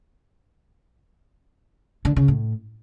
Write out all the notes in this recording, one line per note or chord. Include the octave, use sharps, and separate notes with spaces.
D3
C#3
A2